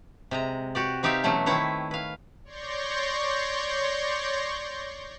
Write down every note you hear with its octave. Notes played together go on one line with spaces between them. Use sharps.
C3 G#3 A#5
F#4 G4 D5
C4 D#4 G4 D5 E5 F5
B2 E3 F#3 A3 C#4
D#3 C4 E4 B4 C#5 E5
B4 F5
C#5 D5 C6 C#6 G6 A#6